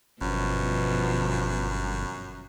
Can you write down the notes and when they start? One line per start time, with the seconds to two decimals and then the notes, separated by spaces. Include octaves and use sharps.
0.21 G1 F#2 B2 F3